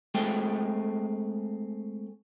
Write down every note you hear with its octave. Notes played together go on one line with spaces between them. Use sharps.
G#3 A3 C4 G#4 A4 G5